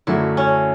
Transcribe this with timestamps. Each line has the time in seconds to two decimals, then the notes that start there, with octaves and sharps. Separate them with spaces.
0.07 F#2 D3 F#3 A3 E4
0.37 C#4